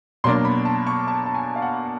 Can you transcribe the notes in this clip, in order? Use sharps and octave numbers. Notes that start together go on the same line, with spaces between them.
B2 F#3 A#3 D4 C6
B5
A5
C#6
A5
A5
G#5
F5
F#5